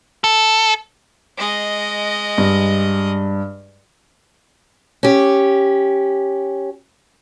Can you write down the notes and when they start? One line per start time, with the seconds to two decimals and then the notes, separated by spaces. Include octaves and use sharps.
0.24 A4
1.38 G#3 D#5
2.38 G2
5.03 C#4 G4